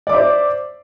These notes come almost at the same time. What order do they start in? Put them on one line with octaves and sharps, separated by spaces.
D5 D6 E5 C5